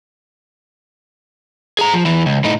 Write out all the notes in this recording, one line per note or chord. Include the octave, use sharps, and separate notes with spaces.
G#4 A#5
F3
E2 E3
C#2
A2 D#4